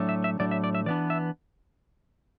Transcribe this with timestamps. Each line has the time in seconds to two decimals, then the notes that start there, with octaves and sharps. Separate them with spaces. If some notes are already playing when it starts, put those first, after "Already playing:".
Already playing: A2 F#3 A3 D4
0.09 E5
0.24 E5
0.39 A2 F#3 A3 D4 D5
0.51 E5
0.64 D5
0.75 E5
0.86 E3 B3 D4 D5
1.10 E5